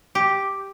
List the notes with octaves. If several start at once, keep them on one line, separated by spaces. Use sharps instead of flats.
G4